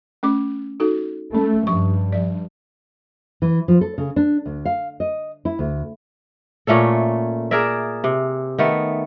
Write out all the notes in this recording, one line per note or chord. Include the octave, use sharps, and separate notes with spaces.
A3 C#4 D6
D#4 F#4 A4
A3 C#4
G2 F3 C#6
F3 D5
E3
F3
A4
C#3
D4
D2
F5
D#5
E4
D2
A#2 A3 C#4 A4
G#4 A#4 D5 E5
C3
D#3 A3 B3